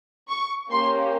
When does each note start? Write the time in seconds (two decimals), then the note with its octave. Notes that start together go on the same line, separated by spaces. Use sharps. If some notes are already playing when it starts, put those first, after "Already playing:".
0.29 C#6
0.71 A#3 C#4 G4 C6